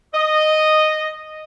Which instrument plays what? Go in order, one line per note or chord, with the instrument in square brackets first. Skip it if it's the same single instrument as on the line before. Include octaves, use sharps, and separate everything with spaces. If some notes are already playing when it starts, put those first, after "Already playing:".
[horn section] D#5